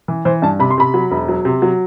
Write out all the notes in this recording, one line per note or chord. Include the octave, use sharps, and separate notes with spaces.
E3
E3 C5
G2 A5
C3 B5
C6
C3 B5
F#3
E1
F#3
C3
F#3